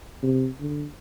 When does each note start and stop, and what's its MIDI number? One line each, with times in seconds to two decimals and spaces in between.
0.23 0.48 48
0.61 0.86 50